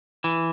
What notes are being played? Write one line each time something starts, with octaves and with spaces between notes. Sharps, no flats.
E3